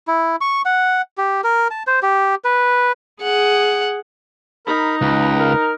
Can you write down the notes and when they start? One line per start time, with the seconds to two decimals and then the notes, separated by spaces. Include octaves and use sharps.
0.07 E4
0.41 C#6
0.65 F#5
1.18 G4
1.44 A#4
1.71 A5
1.87 C5
2.03 G4
2.44 B4
3.22 G#4 F#5
4.67 D#4 A#4 B5
5.01 C#2 B4
5.39 A#4